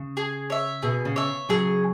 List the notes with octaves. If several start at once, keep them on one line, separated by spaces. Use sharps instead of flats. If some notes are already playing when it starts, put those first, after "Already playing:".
Already playing: C#3
G#4
C#5 E5
B2 G#4
C#3
C#5 E5
C#3 F#3 G#4